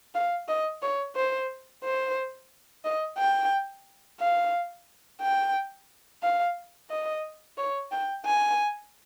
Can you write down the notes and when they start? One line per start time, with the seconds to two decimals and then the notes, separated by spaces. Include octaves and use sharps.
0.15 F5
0.49 D#5
0.82 C#5
1.16 C5
1.84 C5
2.85 D#5
3.18 G5
4.20 F5
5.22 G5
6.23 F5
6.90 D#5
7.58 C#5
7.92 G5
8.26 G#5